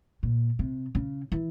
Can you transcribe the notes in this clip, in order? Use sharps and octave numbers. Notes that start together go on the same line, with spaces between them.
A#2
C3
C#3
E3